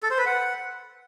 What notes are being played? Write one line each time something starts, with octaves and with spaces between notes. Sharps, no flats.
A4
C5
B4
F#5